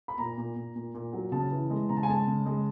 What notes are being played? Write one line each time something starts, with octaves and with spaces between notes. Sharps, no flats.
B5
A#2 A#5
A#2
A#2
A#2
A#2
F#3
C#3 A5
E3
G#3
C#3 A#5
A5
G#5
G#3 A5
C#3
G#3